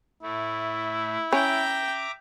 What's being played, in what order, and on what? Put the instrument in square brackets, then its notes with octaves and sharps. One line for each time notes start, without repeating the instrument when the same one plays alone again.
[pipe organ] A2 A3 [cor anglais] E4
[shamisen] C#4 [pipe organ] E5 A#5 D6 [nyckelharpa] G5